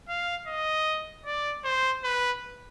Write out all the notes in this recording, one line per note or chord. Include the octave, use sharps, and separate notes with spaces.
F5
D#5
D5
C5
B4